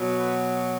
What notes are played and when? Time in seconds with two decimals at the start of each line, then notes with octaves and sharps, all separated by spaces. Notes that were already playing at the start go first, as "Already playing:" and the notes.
Already playing: B2 F#3
0.20 B4